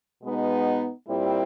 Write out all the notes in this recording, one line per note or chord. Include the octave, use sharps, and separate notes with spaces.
B2 G#3 B3 D#4
A#2 G3 C4 E4 G4